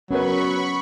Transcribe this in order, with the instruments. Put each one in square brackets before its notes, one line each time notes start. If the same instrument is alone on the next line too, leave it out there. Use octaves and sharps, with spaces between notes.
[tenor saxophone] F#3 [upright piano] B3 A#4 B4 [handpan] C#4 [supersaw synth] B5 C#6